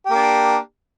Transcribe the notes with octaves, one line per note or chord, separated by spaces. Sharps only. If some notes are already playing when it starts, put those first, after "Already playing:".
A#3 D4 G4